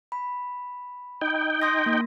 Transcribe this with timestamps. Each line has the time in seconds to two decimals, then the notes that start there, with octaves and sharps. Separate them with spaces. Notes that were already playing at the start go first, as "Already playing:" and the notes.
0.12 B5
1.21 D#4 G5
1.61 C6 D#6 A#6
1.86 A#3